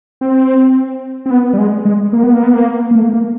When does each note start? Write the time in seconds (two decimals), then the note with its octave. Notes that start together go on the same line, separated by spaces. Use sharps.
0.21 C4
1.26 C4
1.31 B3
1.53 G3
1.58 G#3
1.85 G#3
2.13 A#3
2.23 B3
2.34 A#3
2.43 B3
2.54 A#3
2.91 A#3
2.95 A3
3.13 A#3